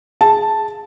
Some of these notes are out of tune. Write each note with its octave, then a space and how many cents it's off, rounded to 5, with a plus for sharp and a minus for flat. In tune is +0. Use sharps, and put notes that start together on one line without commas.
G#4 +0 A5 +0